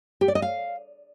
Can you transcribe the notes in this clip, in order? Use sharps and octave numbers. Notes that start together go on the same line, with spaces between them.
G4
D5
D#5
F5